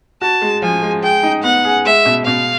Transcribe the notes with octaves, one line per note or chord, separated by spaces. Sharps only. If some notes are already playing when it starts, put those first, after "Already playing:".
F#4 A5
G#3
F3 G#5
G#3
G#4 G5
D#4
B3 F#5
G#4
G#3 E5
B2
B2 F5